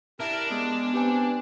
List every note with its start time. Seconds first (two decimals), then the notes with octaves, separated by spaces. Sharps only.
0.20 D4 E4 G4 A#4 E5
0.50 G#3 B3
0.94 C4 G4 B4 G#5